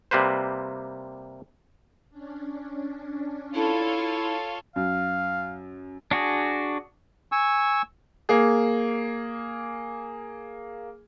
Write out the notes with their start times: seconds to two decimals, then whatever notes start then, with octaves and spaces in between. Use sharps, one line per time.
0.11 C3 G3 A#3 B4 C5
2.10 C#4 D4
3.54 E4 F4 A4 C#5
4.76 F#2 F5
6.11 D4 F#4 G#4
7.32 G#5 C#6 E6
8.29 A#3 G#4